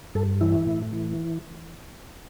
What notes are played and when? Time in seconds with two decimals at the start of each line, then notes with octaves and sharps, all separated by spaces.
0.15 G2 A4
0.41 E3 E4
0.66 A2
0.92 E3